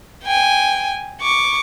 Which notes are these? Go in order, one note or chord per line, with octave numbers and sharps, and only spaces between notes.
G5 G#5
C#6 D6